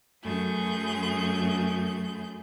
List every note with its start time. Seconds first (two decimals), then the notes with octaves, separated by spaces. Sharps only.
0.22 F#2 F#3 A3 G#4 G6